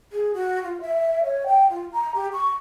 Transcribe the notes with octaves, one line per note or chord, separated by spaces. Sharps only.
G#4
F#4
F4
E5
C#5
G5
F4
A#5
G4
C#6